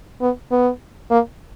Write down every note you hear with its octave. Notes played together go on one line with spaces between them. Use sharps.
B3
B3
A#3